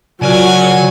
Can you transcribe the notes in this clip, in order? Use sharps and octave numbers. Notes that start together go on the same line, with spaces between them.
C#3 F#3 F4 F#4 A#4 D5 F#5 G#5